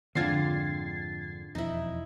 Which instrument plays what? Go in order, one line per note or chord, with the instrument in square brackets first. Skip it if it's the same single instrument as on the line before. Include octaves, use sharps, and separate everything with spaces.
[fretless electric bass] F2 G#2 [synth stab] D3 [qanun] C4 F4 [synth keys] G#6 A6 C7
[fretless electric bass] E1 F2 [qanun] D#4 E4